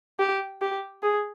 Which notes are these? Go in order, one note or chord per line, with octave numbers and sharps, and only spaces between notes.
G4
G4
G#4